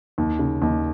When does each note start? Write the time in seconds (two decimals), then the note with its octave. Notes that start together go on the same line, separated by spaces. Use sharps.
0.18 D#2
0.39 C#3
0.62 D#2